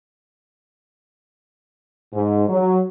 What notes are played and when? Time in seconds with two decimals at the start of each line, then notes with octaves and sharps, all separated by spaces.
2.13 G#2
2.49 F#3